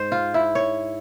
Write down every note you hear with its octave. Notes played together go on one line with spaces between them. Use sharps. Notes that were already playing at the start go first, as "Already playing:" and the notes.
Already playing: G#2 C5
F4
E4
C#5